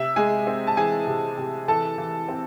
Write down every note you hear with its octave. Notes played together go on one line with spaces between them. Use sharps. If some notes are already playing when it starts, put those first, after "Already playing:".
Already playing: C3 E5 E6
G#3 G#4 G#5
C4
A5
E3 G#4 G#5
C3
C3
E3 A4 A5
E3
C4